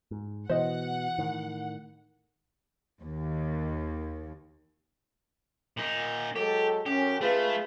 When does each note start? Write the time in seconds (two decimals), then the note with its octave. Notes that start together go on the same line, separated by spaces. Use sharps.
0.11 G#2
0.50 B2 E3 C5 D#5 F#5
1.18 A2 D#3
3.00 D#2
5.77 A#2 D#4
6.36 F#3 G#3 G4 A4
6.86 F#2 C#4 G4
7.21 A3 F4 G#4 B4